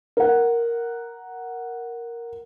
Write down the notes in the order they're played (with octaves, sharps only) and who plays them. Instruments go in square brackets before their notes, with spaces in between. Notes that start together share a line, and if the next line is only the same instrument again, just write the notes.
[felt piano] A#4 F#5